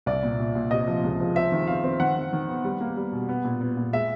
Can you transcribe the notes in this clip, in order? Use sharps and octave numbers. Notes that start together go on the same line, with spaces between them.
C2 D5
A#2
A#2
A#2
C3 D#5
F3
C#2
F3
C4 E5
D#3
C4 F5
C4
D#3 F#5
D#3
D#3
B3
G3
A#3
G3
B2
B3
A#2
B3
A#2
G#3 E5